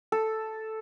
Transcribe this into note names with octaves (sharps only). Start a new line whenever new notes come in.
A4